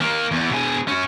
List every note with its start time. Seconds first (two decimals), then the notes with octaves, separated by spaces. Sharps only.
0.01 D#3 A#3
0.31 E2
0.50 B2 G#4
0.88 C#4 F#4